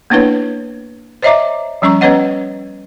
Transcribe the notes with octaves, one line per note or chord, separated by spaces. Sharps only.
A#3 B3 D4 E4 B4 C#5
C5 C#5 D#5 E5 A#5 D6
F3 G3 C#4 A#5 C#6
B3 C#4 B4 C#5 D#5 F#5